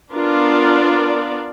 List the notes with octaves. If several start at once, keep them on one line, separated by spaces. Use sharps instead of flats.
B3 D4 F4 A#4 D5